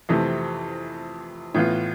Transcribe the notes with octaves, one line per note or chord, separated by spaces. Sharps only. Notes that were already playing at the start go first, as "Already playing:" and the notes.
F2 C3 E3 A3
A2 E3 B3 F4